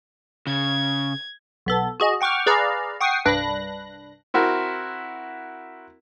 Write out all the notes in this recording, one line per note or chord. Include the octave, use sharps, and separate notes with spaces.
C#3 G#6
B1 B3 A4
F#4 G#4 D#5
F#5 G5 C#6 D6 F6
G#4 B4 D5 F5 A#5
F#5 G5 C#6 D#6 C7
C2 G2 D4 B4 F#6 A#6
C4 E4 F#4 A#4